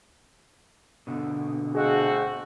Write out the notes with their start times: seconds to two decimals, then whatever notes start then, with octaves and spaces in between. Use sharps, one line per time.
1.07 B2 D3
1.75 A3 C4 F#4 G#4 D#5 F5